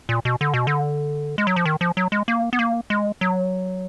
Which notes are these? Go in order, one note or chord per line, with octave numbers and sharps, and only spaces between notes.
A#2
B2
D3
B2
D3
G#3
F#3
F3
D#3
F3
F#3
G#3
A#3
B3
A#3
G#3
F#3